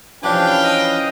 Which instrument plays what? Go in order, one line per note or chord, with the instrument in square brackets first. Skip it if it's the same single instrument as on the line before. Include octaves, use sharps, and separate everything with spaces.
[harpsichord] E3 F3 [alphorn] C#4 [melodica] D4 G4 [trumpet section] B4 F5 G5
[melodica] D#5 D#6